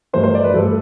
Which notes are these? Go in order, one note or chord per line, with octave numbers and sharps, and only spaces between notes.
G2 E3 A3 C5
C5
D5
B4
G2 E3 A3 A4